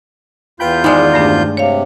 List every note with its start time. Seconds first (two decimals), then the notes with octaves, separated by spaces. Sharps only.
0.60 E2 F4 B4 G5 B5 G6
0.84 D#3 G3 G#3 C5 C6
1.14 G2 A3 D4
1.57 C3 C#5 F5